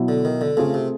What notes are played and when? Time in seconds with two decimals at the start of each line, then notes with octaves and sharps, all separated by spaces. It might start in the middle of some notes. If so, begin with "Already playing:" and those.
Already playing: B2 F#3 B3 E4
0.08 D3
0.25 D#3
0.41 D3
0.57 C#3 A3 C4 F4 G#4
0.74 C3